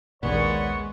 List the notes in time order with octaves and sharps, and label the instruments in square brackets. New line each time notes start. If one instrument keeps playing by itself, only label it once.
[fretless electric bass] A#1 D#2 A#2 [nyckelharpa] G#3 [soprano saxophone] B3 [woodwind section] C#5 D5 C#6